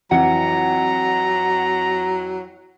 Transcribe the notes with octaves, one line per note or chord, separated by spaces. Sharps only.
F2 E3 F#3 F#5 A#5 C#7